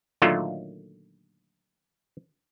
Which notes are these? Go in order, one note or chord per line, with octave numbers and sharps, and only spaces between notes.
A#2 D3 D#3 F#3 A3 F4